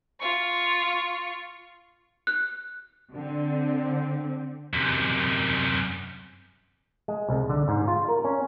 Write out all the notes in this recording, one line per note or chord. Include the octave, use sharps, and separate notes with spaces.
F4 C#6
F#6
D3 C4
F#2 C3
G#3
C2
D3
G#2
F4
A#4
C#4